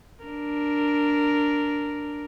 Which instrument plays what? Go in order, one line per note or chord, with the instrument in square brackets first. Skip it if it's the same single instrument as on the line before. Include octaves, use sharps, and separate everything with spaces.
[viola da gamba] D4 A#4